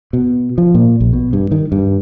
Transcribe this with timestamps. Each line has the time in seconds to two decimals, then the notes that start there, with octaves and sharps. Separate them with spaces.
0.13 B2
0.58 F3
0.75 A#2
1.00 A#1
1.13 B2
1.33 G2
1.52 D#3
1.72 G2